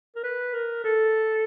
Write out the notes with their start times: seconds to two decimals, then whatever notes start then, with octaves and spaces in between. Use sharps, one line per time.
0.16 A#4
0.24 B4
0.54 A#4
0.84 A4